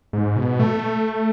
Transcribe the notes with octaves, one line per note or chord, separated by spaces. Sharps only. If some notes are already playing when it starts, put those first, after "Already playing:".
G#2
B2
A3